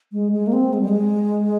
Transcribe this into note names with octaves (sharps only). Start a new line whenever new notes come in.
G#3
G#3
A#3
C4
G#3
G3
G#3